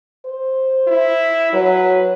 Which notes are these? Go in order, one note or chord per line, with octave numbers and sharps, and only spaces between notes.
C5
E4
F#3 B4